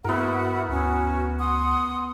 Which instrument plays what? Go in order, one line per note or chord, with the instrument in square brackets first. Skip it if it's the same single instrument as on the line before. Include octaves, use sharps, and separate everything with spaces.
[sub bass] G2 [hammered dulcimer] B3 A#4 [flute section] E4 F#4 F#5
[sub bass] D2 [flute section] C#4 F#4
[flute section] F#5 C6 D#6